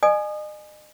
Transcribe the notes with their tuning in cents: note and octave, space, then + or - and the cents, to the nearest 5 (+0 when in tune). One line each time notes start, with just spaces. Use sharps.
D#5 -40 G#5 +5 D#6 -30